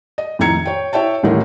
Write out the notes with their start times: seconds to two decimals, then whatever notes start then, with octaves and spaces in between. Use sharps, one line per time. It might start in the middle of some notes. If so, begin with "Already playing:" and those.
0.18 D#5
0.39 F2 A2 D#3 A#5 G#6 C#7
0.65 C#5 G5
0.93 E4 C#5 E5 G5 A5
1.23 D#1 A1 A2 D#4 A#4